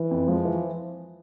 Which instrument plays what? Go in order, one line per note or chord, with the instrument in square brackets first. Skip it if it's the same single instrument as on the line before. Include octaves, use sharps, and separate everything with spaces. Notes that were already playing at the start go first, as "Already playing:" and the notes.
Already playing: [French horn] E3
[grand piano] F2
[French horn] F3 [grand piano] G#3
[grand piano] E3